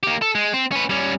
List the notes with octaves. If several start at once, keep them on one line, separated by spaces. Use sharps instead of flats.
A#3 G4
A4
G#3
C4
C#4 B4
G3 C#4